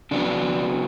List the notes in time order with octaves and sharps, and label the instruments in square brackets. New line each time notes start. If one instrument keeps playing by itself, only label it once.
[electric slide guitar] C#3 F#3 B3 D4